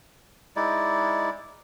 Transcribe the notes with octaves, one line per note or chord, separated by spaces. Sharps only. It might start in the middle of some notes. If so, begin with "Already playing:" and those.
G#3 D#4 E4 D5